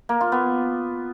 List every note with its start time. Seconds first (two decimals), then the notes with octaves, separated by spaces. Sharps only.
0.09 A#3
0.21 F4
0.32 B3